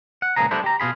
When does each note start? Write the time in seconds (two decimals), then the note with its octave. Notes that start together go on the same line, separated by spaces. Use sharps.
0.22 F#5
0.36 C#2 A#2 F3 G#4 A#5
0.51 G3 A3 B3 D4 E4 C5
0.64 G4 A#5
0.80 B2 F4 G#4 B5